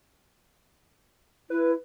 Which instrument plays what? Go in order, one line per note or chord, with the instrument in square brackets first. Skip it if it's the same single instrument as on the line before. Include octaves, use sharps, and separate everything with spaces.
[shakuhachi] E4 [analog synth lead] B4